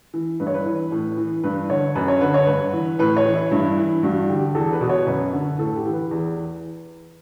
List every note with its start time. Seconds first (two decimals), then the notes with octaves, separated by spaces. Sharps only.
0.14 E3
0.40 G2 B4
0.47 C#5
0.54 B4
0.66 E3
0.92 A2
1.17 E3
1.43 G2 B4
1.70 D3 C#5
1.95 F#2 B4
2.08 C#5
2.21 D3 B4
2.34 C#5
2.47 G2 B4
2.73 E3
2.99 A2 B4
3.17 C#5
3.26 E3
3.34 E4
3.51 G2 E4
3.77 E3
4.03 G2 F#4
4.29 D3 G4
4.55 E2 A4
4.72 B4
4.81 B2
4.90 C#5
5.07 F#2 B4
5.33 D3
5.58 A2 A4
5.76 G4
5.85 E3
5.93 B4
6.11 E2